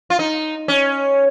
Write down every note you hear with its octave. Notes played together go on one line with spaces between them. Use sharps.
F4
D#4
C#4